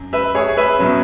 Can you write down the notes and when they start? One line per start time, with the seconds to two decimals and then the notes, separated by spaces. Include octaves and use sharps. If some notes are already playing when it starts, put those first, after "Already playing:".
Already playing: F#2
0.13 B4 E5
0.35 G#4 C#5
0.57 B4 E5
0.79 B2 F#3 C#4